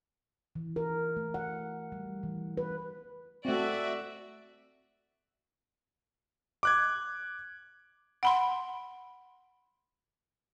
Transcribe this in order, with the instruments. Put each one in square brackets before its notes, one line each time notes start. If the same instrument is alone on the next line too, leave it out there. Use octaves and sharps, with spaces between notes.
[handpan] E3
A#4
A3
F#5
G3
E3
B4
[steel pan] A3 C4 [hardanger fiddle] F#4 D5 [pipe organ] E5
[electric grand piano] D6 F#6 G#6
[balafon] F#5 B5 C6